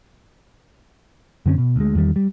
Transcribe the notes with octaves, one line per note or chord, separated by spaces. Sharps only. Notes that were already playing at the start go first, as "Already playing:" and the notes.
F#2 D3 C4 C#4
B2
D2 G#3
E2 D#3 G3
G3